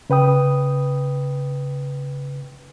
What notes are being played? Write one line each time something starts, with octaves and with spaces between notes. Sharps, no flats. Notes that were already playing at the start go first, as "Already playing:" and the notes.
C#3 B4 G5 D#6